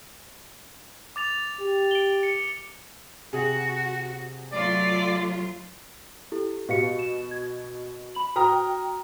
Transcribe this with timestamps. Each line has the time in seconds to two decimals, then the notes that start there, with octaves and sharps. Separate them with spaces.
1.16 D6 A6 F7
1.60 G4
1.91 D7 G7
2.23 C#7
3.33 C3 F#4 G#4
4.52 F#3 A3 F4 D5
6.32 E4 G4 A4
6.69 B2 G4 F5 C#7
6.99 E7
7.31 G#6
8.15 B5 F#7
8.36 F#4 G5 A#5 D#6 F6